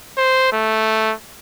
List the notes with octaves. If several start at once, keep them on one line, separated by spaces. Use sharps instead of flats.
C5
A3